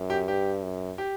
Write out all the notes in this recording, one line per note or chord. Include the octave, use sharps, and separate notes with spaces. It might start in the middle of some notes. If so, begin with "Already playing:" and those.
Already playing: F#2
G4
G2 G4
F#2
G4